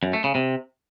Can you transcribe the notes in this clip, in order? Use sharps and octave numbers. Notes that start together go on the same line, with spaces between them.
F#2
A3
C#3
C3